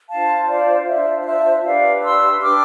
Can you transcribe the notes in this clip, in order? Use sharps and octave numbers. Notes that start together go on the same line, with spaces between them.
D4 F4 C5 F5 A5
D5 F5
D4 F4 C5 E5
F5
E5
D4 G4 B4 D5 F5
C6 E6
D4 G4 B4 D6 F6